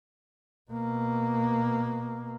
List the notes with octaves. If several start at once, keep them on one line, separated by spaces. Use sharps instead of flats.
B2 A#3